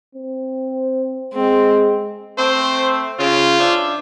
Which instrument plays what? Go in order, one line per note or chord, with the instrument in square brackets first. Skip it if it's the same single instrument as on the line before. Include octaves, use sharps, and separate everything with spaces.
[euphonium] C4
[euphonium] G#3 [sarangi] C4
[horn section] A3 C4 [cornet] C5
[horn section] C#3 [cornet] F4
[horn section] D4 C5 E5